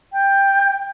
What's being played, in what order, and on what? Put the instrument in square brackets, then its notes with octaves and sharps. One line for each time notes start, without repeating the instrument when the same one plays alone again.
[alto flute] G5